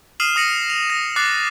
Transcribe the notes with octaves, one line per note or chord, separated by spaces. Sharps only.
D#6 F6 C7 D#7 E7 F#7
D#6 F6 A#6 C#7 D#7 F#7
F7
A#6
D6 F#6 A6 C7